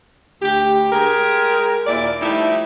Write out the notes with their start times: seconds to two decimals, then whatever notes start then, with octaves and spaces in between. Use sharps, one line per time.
0.42 D2 G4
0.92 G#3 G4 G#4 A#4
1.87 D#2 A#2 E4 D5
2.21 F3 G3 A3 D#4 E4